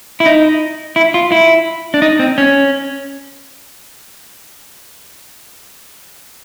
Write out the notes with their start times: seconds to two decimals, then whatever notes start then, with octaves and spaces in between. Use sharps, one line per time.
0.20 E4
0.26 D#4
0.96 E4
1.14 F4
1.32 E4
1.94 D4
2.02 D#4
2.19 C4
2.38 C#4